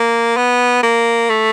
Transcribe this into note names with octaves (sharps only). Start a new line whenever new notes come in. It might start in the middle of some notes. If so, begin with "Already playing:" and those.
Already playing: A#3
B3
A#3
A3